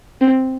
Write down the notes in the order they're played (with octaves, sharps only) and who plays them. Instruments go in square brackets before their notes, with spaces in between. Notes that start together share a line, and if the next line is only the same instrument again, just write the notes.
[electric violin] C4